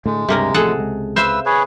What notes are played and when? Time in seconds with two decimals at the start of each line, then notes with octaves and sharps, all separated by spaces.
0.06 A2 D3 G#3 A3
0.29 C#2 G2 C3 A#3 A#4
0.54 A1 F3 A3 G#4 A4 F#5
0.77 C#2 G#3
1.16 B4 C5 E5 F5 E6
1.46 G#4 B4 C#5